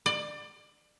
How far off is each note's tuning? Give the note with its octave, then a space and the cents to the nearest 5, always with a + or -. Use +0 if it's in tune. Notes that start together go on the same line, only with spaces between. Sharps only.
D5 +25